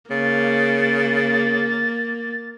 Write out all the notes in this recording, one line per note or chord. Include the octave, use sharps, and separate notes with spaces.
C#3 A#3 A6